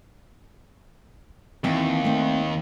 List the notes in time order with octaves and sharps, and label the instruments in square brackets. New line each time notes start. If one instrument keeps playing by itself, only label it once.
[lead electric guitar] D#2 [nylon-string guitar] E3 C4 G5
[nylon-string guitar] A3 C4